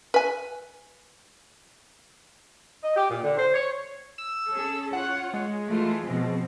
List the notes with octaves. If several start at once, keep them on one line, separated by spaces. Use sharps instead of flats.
B4 G#5
D#5
G4
A#2
D3
C5
C#5
E6
C#4 G#4 A4
F4 C#5 F#5
G#3
E3 A3 F4
B2 F3 C4